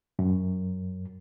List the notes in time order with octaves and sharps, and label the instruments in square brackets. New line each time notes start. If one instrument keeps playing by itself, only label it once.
[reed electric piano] F#2